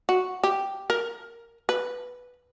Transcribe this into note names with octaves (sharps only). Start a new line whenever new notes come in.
F#4
G4
A#4
B4